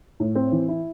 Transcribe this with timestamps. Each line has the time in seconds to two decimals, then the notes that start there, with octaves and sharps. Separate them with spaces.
0.20 A2
0.35 C4
0.52 E3
0.68 E4